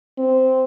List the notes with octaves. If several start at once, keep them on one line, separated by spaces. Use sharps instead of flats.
C4